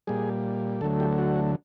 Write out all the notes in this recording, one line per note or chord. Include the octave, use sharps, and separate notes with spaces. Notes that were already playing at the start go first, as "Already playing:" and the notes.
A#2 G3 G#4
D2 D3 F#3 A3 A4
G4
F#4